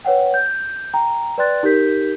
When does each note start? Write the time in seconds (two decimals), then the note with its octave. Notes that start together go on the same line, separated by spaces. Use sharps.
0.05 B4 C#5 F#5 G5
0.34 G6
0.94 G5 A#5
1.38 B4 D5 G5 C6 F#6 A6
1.63 D#4 G4 A#4 G6 B6